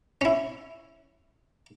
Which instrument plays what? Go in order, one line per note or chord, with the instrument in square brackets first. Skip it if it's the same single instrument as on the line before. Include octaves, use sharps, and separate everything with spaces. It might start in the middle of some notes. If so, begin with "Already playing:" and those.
[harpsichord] C#4 E4